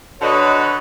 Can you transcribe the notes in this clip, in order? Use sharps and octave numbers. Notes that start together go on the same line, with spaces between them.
D3 F#4 B4 C#5 D#5